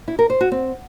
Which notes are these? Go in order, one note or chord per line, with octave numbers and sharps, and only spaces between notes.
E4
A#4
C5
F#4
C4